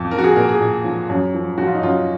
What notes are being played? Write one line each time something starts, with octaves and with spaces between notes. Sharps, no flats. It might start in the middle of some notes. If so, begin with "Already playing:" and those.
Already playing: F2
F3 A#4
F#4
G#4
A#2 A#4
G#4
A#2
F3
F#2
F3
F3 F#4
F4
D#4
F#2 F4